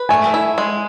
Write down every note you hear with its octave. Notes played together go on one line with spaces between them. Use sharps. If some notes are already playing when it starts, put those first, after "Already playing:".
Already playing: B4
A3 G#5
E4
G#3